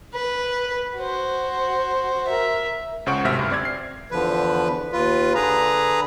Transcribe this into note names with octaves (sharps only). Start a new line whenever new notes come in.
B4
F#4 C5
A#4 E5
C#2 C#3 C5 F#5 C#6 D7
G#1 D2 C3 E5 F6
D2 G2
C4 D5 G#6
C7
E2 D3 F3 B4
D#2 F4 B4
D3 G#4 B4 A#5